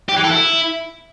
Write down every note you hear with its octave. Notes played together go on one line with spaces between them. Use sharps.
G4
E3
A4
E4